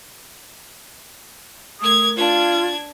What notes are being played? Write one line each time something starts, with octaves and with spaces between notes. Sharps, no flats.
A3 A#4 D#6 G#6
D4 F4 G#6